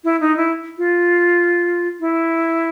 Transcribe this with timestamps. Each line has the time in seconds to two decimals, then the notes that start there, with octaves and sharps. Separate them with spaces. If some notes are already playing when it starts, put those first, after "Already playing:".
0.04 E4
0.20 D#4
0.37 E4
0.78 F4
2.00 E4